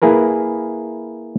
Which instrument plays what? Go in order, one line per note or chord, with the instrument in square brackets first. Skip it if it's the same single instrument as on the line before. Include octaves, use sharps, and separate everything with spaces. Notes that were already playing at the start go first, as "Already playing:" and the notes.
[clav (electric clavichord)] A#3 E4 G#4 A#4 B4